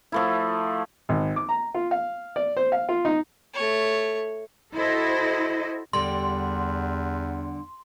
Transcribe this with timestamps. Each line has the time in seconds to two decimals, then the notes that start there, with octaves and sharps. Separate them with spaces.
0.12 F3 A3 E4
1.09 G#1
1.36 D6
1.49 A#5
1.75 F4
1.91 F5
2.36 D5
2.57 C5
2.72 F5
2.89 F4
3.05 D#4
3.54 A3 C#5
4.74 E4 F#4 A4 C5 D#5
5.93 E2 D3 G3 C6